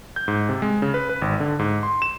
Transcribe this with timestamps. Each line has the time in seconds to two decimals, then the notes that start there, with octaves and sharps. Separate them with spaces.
0.16 G6
0.28 G#2
0.49 C3
0.62 G#3
0.82 C#3
0.94 B4
1.09 B4
1.22 G#1
1.40 D3
1.59 G#2
1.83 C6
2.02 E7